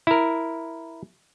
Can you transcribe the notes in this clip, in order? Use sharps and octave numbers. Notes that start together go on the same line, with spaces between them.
E4 A#4